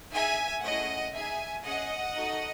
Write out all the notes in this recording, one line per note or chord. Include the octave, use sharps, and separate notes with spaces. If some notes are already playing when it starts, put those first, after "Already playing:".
D#4 G#4 E5 G#5
A3 C#4 E4 G#4 D#5 F#5
D#4 G#4 E5 G#5
C#4 G#4 D#5 F#5
D#4 F#4 A4